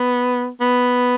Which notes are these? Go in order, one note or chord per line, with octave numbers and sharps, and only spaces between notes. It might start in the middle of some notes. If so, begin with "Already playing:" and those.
Already playing: B3
B3